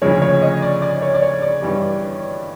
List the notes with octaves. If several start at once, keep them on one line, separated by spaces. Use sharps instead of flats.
D2 C#3 F3 G#3 C#5
C#5
D#5
D5
D5
C#5
D5
C#5
D5
G2 E3 G3